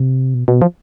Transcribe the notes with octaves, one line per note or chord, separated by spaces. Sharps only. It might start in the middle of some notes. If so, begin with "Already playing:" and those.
Already playing: C3
B2
B2
F3